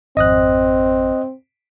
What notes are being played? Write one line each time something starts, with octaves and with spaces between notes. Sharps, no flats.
G#1 F2 C4 D#5 D#6 F#6